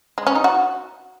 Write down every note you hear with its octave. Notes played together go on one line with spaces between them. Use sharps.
G#3
C#4
D#4
F#4